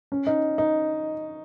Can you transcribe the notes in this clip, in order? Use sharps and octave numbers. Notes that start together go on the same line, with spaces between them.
C#4
D#4
D#4